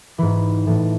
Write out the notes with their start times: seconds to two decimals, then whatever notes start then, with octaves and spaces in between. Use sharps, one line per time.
0.18 G#2 E3 B5
0.67 A2 E3 A5